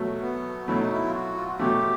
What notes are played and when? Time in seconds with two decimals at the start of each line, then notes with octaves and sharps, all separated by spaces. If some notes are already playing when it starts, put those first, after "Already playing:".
Already playing: B2 F#3 A3
0.21 B3
0.68 B2 F#3 A3 E4
0.80 D#4
0.91 E4
1.07 F4
1.14 F#4
1.36 F4
1.48 F#4
1.59 B2 F#3 A3 G4